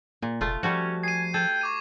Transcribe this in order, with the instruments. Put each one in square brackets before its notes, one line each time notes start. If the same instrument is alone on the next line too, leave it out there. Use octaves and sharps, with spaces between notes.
[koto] A#2 [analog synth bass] A#3
[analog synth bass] F1 [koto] A3 F4
[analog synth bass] F3 [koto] G3 A3 F#4 [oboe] C#4
[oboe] G#5 [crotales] C7 D#7
[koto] A4 [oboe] G5 [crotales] G#6 D#7
[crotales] C#6 D6 D#7